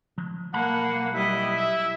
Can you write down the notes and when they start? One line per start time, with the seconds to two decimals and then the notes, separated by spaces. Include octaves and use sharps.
0.18 F3
0.54 B1 A#3 F#5 A5 B5
1.14 G3 E4 D#5 B6
1.57 E5